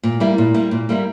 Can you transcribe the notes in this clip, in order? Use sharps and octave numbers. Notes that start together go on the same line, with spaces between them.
A#2
G3 A#3 E4
A#2
G3 A#3 E4
A#2
G3 A#3 E4